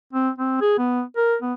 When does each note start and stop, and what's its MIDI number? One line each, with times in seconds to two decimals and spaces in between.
0.14 0.30 60
0.39 0.61 60
0.61 0.78 68
0.78 1.03 59
1.17 1.36 70
1.42 1.54 59